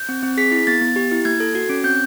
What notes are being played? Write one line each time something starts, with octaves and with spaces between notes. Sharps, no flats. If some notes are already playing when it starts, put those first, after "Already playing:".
Already playing: G6
C4
C4
G#4 B6
E4
B3 A6
B3
G4
E4
A#3 G#6
A4
F#4
C#4
C4 G6